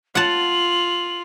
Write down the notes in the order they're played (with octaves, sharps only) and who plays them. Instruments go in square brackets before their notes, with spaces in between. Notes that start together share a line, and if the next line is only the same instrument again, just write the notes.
[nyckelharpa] F4 [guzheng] F#5 A5 [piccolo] F#7